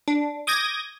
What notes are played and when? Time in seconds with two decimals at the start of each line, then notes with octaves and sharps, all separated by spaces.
0.08 D4
0.47 D6 D#6 G6 G#6 A#6